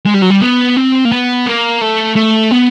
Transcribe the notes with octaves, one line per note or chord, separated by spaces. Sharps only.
G#3
G3
F#3
G3
B3
C4
A#3
B3
A#3
A3
A3
B3